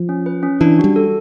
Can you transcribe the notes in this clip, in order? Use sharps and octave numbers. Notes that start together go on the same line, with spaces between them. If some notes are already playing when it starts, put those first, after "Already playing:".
Already playing: F3
C#4
B4
C#4
E3 D4
F#4
G3
A4